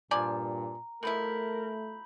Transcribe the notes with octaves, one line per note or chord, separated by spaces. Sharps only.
G2 A#2 F3 D5 G#5 A#5
B2 F3 A3 E4 A#4 B5 G6 F#7